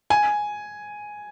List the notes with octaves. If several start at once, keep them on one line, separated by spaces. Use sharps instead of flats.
G#5